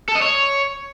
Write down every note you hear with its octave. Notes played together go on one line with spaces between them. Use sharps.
A4
D#5
C#5